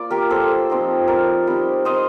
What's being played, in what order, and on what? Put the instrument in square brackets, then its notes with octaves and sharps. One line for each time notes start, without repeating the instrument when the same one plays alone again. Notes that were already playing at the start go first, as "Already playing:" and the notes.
Already playing: [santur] A#3 F4 D5
G4 A#4
A4 C5
F3 C4 D#4
A#4 D5
G3 C4 D#4
C5 D#5